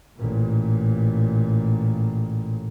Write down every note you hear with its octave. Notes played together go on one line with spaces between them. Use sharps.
A1 A#2